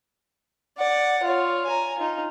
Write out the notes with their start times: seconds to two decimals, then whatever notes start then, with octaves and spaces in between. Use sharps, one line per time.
0.78 D5 F#5
1.23 F4 C#5
1.66 G#5 A#5
1.98 D#4 F4